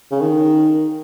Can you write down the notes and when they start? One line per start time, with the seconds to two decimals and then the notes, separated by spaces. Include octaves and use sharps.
0.12 C#3
0.21 D#3